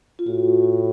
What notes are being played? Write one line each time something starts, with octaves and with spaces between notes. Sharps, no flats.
F4
A2 F#4